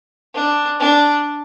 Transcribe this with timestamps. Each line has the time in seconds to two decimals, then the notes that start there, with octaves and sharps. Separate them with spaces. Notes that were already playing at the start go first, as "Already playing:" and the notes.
0.35 D4
0.80 D4